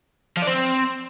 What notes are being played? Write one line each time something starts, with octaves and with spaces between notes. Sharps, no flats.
F3
D4
C4